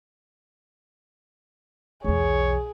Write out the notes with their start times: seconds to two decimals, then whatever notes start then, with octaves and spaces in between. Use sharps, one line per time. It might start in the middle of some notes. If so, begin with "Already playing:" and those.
2.04 B1 E2 G#4 C#5